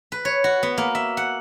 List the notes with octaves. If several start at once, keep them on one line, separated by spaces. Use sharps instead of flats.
B4
C#5
F#4
B3
A#3
E5
F#5